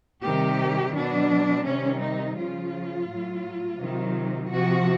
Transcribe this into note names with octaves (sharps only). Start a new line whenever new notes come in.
C3 D#3 G3 G4
B2 F#3 D4
C3 D#3 G3 C#4
D#4
C#3 F3 F4
A2 F#3
C3 D#3 F#3
C3 F3 F#4